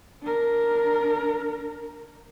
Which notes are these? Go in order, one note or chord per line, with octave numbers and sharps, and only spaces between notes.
D4 A#4